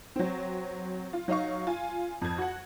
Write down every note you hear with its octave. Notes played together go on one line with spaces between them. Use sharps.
F#3 C4
F4
F#3 D#4 F5 C#6
F4 G#5
F2 G#6
F#4 F#5